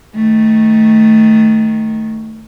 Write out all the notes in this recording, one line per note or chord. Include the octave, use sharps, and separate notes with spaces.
D#3 A3